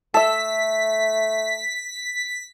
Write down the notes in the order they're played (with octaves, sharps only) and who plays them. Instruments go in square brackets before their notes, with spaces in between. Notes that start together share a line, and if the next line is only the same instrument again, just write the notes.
[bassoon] A3 [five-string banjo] A4 E5 [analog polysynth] B6